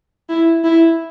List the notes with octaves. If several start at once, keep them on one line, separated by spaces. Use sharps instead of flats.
E4
E4